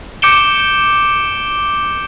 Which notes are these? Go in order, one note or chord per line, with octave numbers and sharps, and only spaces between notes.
D6 G6 C#7 D7 E7 G7